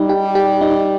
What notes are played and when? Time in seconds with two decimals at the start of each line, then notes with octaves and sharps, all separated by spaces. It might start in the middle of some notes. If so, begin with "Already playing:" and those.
Already playing: G3 D#4
0.09 G4
0.35 G4
0.61 D#4